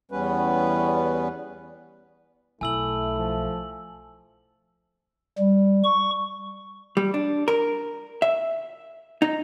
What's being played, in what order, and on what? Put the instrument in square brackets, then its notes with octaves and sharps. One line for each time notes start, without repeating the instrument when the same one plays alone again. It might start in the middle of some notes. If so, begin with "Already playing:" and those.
[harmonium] E2 G3 B3 C#4 B4
[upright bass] B1 [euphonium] A3 [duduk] E4 [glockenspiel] G#5 E6 F#7
[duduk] F3
[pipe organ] G3
C#6
[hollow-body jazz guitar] G3
D4
A#4
E5
D#4